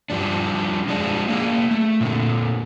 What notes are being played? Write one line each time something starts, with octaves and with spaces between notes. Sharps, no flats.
F3 G3 D4
F3 G#3 D4
A#3 G#4
A3
A#2 D3